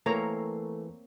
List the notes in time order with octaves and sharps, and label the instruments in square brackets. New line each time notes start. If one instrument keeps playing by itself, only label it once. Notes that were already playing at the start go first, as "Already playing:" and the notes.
[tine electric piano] E3 [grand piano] A3 [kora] A#3 C4 C#5 [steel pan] A#4 A#5